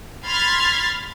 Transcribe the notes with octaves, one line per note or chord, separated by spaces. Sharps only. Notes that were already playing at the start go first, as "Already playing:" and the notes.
B5 C6 F6 G#6 A6 B6